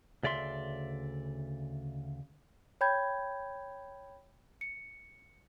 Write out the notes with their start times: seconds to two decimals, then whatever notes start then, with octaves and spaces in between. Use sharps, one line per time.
0.23 D2 C#3 D5 E5 C6
2.81 C#5 G5 B5 G6 G#6
4.61 C#7